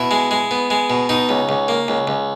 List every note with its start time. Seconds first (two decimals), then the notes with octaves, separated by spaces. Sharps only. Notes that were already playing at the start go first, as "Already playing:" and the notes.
Already playing: B2 E4
0.11 G#3
0.31 G#3
0.51 B3
0.70 G#3
0.90 B2
1.09 B2 D#4
1.29 C#2
1.49 C#2
1.68 A#3
1.88 C#2
2.07 C#2